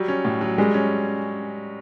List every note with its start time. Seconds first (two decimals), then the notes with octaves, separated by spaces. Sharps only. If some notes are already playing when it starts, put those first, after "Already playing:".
Already playing: F#3 G3
0.08 C#4
0.25 A2
0.41 F#3
0.58 G3 G#3
0.74 C#4